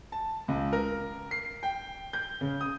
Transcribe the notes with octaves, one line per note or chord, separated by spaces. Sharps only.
A5
C#2
A#4
C7
G5
G6
C#3
D#6